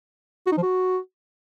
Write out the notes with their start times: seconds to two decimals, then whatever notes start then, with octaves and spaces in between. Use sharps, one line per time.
0.47 F#4
0.52 D#4
0.57 F3
0.63 F#4